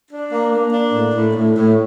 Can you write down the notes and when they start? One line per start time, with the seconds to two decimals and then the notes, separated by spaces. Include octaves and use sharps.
0.11 D4
0.32 A#3
0.52 A#3
0.73 D4
0.93 A2
1.14 A2
1.35 A2
1.56 A2